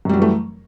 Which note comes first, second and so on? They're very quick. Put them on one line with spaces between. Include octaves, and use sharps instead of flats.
F#2 G3 F#3 E3 A3